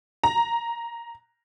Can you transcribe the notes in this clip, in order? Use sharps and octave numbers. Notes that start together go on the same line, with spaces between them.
A#5